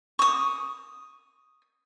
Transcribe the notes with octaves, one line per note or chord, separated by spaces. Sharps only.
C#6 D#6